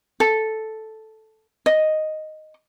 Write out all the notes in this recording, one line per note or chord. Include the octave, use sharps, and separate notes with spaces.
A4
D#5